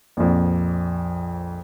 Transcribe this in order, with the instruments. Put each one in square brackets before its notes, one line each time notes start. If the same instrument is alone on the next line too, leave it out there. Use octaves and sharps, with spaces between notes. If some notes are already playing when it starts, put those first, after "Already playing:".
[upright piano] A#1 F2